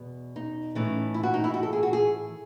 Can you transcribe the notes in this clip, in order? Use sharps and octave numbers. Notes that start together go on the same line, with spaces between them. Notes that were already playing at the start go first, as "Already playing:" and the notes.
Already playing: E2 B2
D#4
A2 E3 A3 C#4
E4
F#4
D#4
E4
F#4
A4
G#4
F#4
G#4